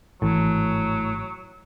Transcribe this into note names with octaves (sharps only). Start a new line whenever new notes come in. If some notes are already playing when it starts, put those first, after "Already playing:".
G#1 A2 E3 F#3